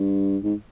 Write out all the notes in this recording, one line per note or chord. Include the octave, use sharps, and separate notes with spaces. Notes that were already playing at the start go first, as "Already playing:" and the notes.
Already playing: G2
G#2